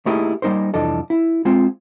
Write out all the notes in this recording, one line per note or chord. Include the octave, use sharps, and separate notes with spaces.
A3 A#3 D#4 E4 G4 G#4
G3 A#3 D#4 A#4 C5
C2 F2 E3 D4 A4 D#5
E4
G#3 C4 F4